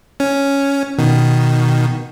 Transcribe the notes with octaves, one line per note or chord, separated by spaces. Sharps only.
C#4
B2 D#3